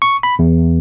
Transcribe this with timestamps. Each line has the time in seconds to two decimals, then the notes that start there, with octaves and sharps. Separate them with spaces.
0.02 C#6
0.23 B5
0.39 E2